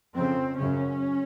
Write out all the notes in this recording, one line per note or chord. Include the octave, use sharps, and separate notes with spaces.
F2 C#3 C4
F#2 C#3 C#4